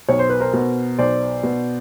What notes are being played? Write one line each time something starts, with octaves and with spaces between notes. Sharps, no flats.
B1 C#5
C5
B4
A#4 C5
B2
B1 C5 D5
B2